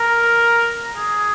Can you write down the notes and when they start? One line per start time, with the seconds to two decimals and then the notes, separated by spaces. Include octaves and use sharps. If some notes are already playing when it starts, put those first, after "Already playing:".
Already playing: A#4
0.96 G#4